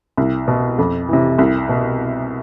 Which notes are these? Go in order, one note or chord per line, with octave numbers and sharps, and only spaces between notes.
C2
B2
F2
C3 E3
C2
B2